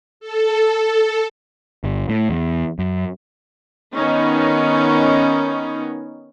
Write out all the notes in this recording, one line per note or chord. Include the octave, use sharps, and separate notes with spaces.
A4
G1
A2
E2
F#2
D#3 B3 C#4 D#4